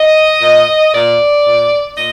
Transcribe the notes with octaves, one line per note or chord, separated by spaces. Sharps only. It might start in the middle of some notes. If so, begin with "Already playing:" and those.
Already playing: D#5
A#2
A#2 D5
A#2
A#2 D#5